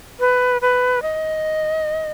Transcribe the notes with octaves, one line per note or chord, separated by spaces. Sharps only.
B4
B4
D#5